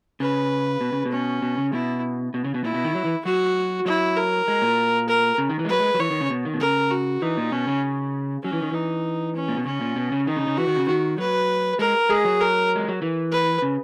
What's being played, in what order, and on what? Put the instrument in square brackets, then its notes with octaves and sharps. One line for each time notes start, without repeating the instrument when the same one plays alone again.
[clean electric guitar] C#3 [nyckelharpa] B4
[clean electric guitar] B2
C#3
B2
[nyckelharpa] C#4
[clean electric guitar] B2
C#3
[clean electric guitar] B2 [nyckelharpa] E4
[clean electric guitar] B2
C#3
B2
[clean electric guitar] A#2 [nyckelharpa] E4
[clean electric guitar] B2
D#3
F#3
E3
[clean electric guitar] F#3 [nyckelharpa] F#4
[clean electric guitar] F#3 [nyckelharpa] E4
[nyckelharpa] A#4
[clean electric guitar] G#3
A#2
[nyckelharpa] A#4
[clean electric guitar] C#3
D#3
E3
G#3
[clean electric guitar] F#3 [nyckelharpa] B4
[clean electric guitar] G#3
F#3
[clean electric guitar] E3 [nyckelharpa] C#5
[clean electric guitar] D#3
C#3
B2
D#3
B2
[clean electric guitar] C#3 [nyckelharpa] A#4
[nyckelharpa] F#4
[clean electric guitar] E3 [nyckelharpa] D#4
[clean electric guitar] A#2
[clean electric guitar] B2 [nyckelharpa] C#4
[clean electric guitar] C#3
[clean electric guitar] F#3 [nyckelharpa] C#4
[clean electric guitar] E3
D#3
[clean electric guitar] E3 [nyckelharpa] D#4
[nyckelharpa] C#4
[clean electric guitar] A#2
B2
[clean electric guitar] C#3 [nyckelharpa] C#4
[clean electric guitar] A#2
B2
C#3
[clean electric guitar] D#3 [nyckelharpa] D#4
[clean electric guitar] C#3
C#3
[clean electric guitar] E3 [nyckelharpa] F#4
[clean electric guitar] D#3
C#3
[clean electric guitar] D#3 [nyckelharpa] F#4
[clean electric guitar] F#3 [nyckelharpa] B4
[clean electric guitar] G#3 [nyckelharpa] A#4
[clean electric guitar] G#3 [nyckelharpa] G#4
[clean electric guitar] F#3
[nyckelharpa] A#4
[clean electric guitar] G#3
F#3
E3
[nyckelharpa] B4
[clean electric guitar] C#3